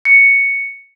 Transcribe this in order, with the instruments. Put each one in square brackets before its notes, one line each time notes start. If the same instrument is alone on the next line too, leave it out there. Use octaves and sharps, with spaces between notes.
[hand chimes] C#7